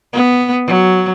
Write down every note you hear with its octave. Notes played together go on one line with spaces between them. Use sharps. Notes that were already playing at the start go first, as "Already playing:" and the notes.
B3
F#3